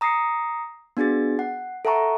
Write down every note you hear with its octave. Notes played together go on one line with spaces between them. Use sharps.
A#5 D#6 A#6 C7 C#7
B3 D4 F#4 G#4 A6
F#5
A4 E5 F#5 A5 A#5 C#6